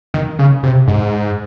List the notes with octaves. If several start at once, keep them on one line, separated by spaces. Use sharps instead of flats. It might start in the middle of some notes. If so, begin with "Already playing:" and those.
D#3
C#3
C3
G#2